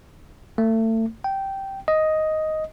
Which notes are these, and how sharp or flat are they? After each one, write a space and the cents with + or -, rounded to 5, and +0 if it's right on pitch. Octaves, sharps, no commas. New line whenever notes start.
A3 +30
G5 -10
D#5 +5